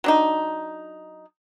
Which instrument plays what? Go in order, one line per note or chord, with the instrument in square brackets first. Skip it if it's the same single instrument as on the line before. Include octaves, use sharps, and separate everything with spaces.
[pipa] F#3 D4 D#4